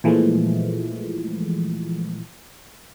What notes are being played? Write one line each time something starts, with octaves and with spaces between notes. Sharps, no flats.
A#2 E3 F3 G#3 A3